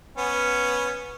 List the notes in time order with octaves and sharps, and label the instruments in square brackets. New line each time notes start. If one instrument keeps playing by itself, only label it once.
[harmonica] B3 C#4